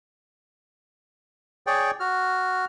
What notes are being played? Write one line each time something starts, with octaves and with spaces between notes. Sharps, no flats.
G#4 C#5 D5 G5
F#4 F6